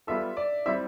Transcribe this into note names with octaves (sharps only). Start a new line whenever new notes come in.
G3 B3 F4 A4 E5
D5
G3 C4 E4 E5